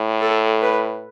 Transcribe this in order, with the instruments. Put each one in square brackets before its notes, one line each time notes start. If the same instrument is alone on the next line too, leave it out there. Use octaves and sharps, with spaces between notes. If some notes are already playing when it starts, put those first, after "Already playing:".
Already playing: [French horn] A2
[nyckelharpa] A4
B4